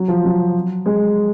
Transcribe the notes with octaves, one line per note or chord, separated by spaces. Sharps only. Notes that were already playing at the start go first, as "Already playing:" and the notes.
Already playing: F#3
F3
F#3
G#3